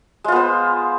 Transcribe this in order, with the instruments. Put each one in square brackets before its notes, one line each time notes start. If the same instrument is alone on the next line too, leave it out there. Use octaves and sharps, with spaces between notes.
[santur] G#3
F4
B3
C5